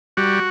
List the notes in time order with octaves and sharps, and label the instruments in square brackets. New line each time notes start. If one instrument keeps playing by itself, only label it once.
[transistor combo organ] G3 F#4